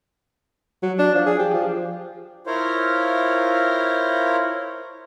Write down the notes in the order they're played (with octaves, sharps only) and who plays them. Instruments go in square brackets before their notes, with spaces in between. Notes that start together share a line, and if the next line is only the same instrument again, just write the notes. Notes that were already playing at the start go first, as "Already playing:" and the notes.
[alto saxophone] F#3
D4
F3
G#4
G4
F3
[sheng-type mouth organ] E4 F4 A#4 C5 C#5 F5